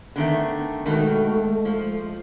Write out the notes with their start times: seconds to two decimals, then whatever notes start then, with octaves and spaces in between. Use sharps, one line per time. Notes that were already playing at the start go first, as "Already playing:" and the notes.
0.16 D3 D#3 A3 B3
0.86 B2 D#3 G#3 A3
1.65 F3